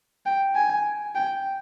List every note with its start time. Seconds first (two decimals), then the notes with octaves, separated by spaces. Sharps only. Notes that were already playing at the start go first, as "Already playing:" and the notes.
0.26 G5
0.55 G#5
1.15 G5